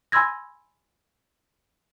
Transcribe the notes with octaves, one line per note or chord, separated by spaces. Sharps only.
G#5 B5 C6 E6 G#6 A#6